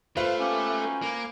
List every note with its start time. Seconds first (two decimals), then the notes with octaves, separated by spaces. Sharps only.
0.17 A3 F4 B4 C5 F5
0.39 A#3 B3 C#4 G4
0.79 D#4 F#4 G5
1.02 A#3 G#5 D6